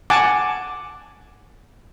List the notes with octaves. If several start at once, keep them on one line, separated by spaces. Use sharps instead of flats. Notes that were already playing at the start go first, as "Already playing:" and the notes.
F#5 G#5 A5 D6